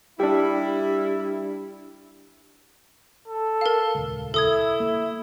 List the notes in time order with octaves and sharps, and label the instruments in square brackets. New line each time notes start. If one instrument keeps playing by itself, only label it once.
[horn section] G3 E4 [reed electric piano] D4 G4
[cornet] A4
[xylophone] A#4 F5
[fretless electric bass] D#1 C#2
[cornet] E4 [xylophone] A4 D#6 G#6
[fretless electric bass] A#3